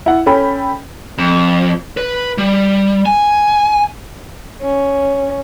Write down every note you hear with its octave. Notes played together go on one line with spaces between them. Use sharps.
E4 F#5
C#4 A4 G5 B5
F2
B4
G3
G#5
C#4